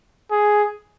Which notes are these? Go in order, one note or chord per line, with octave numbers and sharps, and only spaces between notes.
G#4